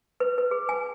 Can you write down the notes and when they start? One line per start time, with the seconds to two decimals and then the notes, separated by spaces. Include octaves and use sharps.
0.20 B4
0.38 B4
0.51 G#4
0.69 G#5